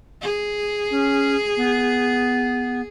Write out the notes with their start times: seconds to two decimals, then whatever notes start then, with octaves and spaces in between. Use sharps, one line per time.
0.22 G#4
0.91 C#4
1.57 B3